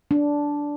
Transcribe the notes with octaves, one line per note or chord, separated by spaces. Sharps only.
D4